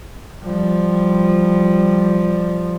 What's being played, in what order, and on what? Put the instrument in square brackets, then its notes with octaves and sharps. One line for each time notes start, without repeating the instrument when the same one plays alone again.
[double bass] F3 G3